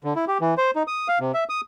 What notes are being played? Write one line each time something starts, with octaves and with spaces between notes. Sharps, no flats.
D3
E4
G4
E3
C5
D#4
D#6
F5
C3
E5
D#6